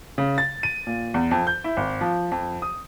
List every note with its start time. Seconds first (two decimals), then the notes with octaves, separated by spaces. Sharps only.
0.18 C#3
0.38 A6
0.63 D#7
0.87 A#2
1.14 E2
1.31 F2
1.47 G6
1.64 E4
1.77 G#1
2.01 F3
2.31 F2
2.62 D#6